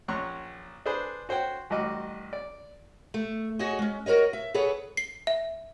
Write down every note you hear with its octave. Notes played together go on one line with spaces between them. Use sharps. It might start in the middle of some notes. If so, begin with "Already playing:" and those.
A#1 C#4 A#5 C6 C#6 F#6
D4 G#4 B4 C5
F#4 C5 C#5 G5
A1 G2 F#4 D#5 D6
D5
A3
F#4 G#4 C#5 D#5 G#5
G#3 C#4
F#4 A#4 B4 C#5 D#5
E5
G#4 A4 B4 C#5 F#5
C7
E5